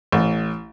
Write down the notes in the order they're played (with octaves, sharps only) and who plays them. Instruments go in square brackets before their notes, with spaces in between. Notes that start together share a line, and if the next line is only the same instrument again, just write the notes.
[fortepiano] A1